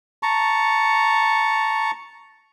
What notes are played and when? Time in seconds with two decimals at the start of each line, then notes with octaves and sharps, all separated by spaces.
0.23 A5 A#5 C#6